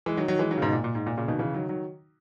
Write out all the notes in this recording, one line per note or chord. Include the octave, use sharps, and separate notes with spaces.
E3 G#3
D#3 F#3
D#3 F#3
E3 G#3
D#3 F#3
C#3
G#2 B2
A#2
A#2
G#2
A#2
A#2 C#3
B2 D#3
C#3 E3
D#3 F#3
D#3 F#3